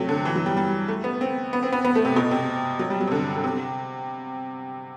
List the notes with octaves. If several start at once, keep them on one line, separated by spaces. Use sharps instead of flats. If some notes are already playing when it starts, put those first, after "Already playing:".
Already playing: C3 F#3 A3
D3
E3
F#3
G3
G3
A3
B3
C4
B3
C4
B3
B3
A3
C3
B2
C3
F#3
G3
F#3
C3
D3
D3
C3